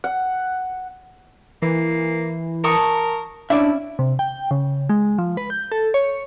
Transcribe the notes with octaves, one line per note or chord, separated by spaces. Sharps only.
F#5
E3 A#3
A#4 A5 C#6 D#6
C#4 D4 E4 D5 E5
C3
G5
C#3
G#3
F3
B4
G6
A4
C#5